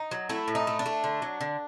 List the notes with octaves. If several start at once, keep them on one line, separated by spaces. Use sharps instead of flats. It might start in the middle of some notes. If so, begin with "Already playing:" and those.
Already playing: D#4
F#3
A3 E4
A2
D#4
A3
D4
A3
D3
F#3
D3